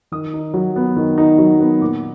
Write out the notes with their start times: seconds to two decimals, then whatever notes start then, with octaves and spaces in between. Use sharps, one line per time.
0.12 D#3 D#6
0.33 D#4
0.54 F#3
0.76 B3
0.97 D#3
1.18 D#4
1.38 F#3
1.60 B3
1.82 A#2 D6